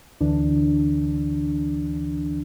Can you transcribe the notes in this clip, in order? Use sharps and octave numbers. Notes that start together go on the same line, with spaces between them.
D2 D3 E3 D4